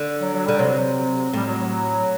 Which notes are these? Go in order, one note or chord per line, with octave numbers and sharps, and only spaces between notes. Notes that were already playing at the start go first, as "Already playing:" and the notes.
Already playing: D3
F#3
F#3
D3 G3
C3 F#3
F#3
A2 G3
F#3
F#3